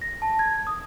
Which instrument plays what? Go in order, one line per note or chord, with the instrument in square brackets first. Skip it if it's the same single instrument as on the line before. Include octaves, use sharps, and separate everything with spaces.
[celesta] A#6
A5
G#6
D#6